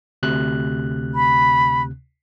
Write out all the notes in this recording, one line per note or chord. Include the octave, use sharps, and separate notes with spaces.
D2 C3 F#6
B5